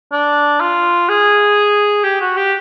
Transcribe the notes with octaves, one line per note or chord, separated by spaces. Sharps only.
D4
F4
G#4
G4
F#4
G4